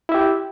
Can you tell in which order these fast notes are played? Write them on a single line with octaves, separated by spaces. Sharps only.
E4 E5 G4